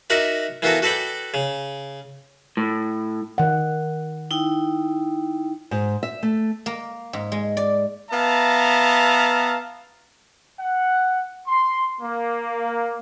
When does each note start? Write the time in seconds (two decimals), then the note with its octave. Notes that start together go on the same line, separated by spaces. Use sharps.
0.10 D#4 F#4 A#4 D5 E5
0.62 E3 A#3 B3 F#4 A4
0.82 F#4 A4 B4 D5 G5
1.34 C#3
2.57 A2
3.38 D#3 F#5
4.31 D#4 E4 G5
5.71 G#2
6.03 E5
6.23 A3
6.66 A#3
7.13 G#2
7.32 G#3
7.57 D5
8.11 B3 E5 F5 A5 A#5
10.60 F#5
11.47 C6
12.00 A#3